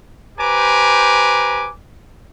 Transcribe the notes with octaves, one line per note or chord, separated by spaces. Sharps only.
G4 B4 C5 G#5 A#5 D6